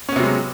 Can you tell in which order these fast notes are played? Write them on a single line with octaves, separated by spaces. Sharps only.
C#4 B3 C3 F#3 G#3